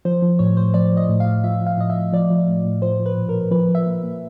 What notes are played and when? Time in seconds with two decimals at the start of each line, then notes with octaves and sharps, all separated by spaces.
0.05 F3 C5
0.22 F3
0.39 A2 C#5
0.57 A2 C5
0.74 F3 D5
0.92 F3
0.97 D#5
1.09 A2
1.20 F5
1.26 A2
1.44 F3 E5
1.61 F3
1.67 F5
1.78 A2 D#5
1.90 E5
1.96 A2
2.13 F3 D5
2.30 F3
2.48 A2
2.65 A2
2.82 F3 C5
3.00 F3
3.06 B4
3.17 A#2
3.29 A#4
3.35 A#2
3.51 F3 B4
3.69 F3
3.75 E5
3.86 A#2
4.03 A#2